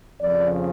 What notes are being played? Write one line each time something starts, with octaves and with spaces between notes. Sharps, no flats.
F2 C#3 F3 D5